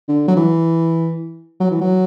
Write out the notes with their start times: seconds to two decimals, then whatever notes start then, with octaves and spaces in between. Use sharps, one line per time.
0.09 D3
0.28 F#3
0.36 E3
1.60 F#3
1.71 E3
1.81 F#3